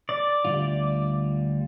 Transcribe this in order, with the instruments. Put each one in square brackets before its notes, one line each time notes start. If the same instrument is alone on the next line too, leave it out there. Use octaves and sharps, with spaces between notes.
[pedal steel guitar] D5
[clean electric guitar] D2 G3 F4